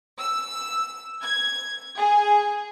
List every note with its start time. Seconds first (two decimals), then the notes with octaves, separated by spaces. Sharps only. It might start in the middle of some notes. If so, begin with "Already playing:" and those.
0.18 E6
1.21 G#6
1.97 G#4